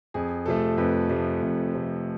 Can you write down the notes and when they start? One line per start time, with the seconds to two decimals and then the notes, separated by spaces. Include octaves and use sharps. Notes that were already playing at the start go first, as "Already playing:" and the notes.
0.14 F2 G#4
0.46 C3 F3 A3 A4
0.78 F2 B4
1.10 C3 F3 A3
1.42 F2
1.75 C3 F3 A3